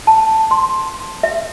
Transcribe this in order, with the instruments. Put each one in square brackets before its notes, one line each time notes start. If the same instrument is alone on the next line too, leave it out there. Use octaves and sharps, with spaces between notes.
[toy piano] A5
C6
E5